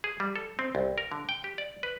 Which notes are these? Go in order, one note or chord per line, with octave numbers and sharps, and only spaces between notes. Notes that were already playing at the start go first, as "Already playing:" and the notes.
G#4
G3
A4
C4
C2
A#4
D3
G5
G4
D5
B4